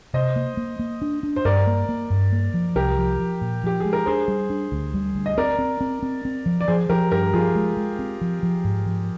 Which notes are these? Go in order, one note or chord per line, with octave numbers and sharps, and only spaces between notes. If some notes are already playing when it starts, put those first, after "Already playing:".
C3 C5 D#5
A#3
A#3
A#3
D4
D4
C5
G2 A#4 D5
A#3
A#3
G2
A#3
F3
C2 G4 A#4
F3
F3
A#2
F3 G4
G#3 G#4
A#4
D4 G#4 C5
G3
D4
D2
G3
D2
D#5
C4 A#4 D5
C4
C4
C4
C4
F3
D5
F3 G#4 C5
F3 G4 A#4
G2 G4 A#4
F3 F4 G#4
G#3
G#3
C4
F3
F3
G#2
F3